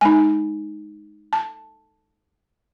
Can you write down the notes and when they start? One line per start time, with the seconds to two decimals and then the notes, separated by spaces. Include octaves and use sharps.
0.01 G#3 D#4 G#5
1.33 A5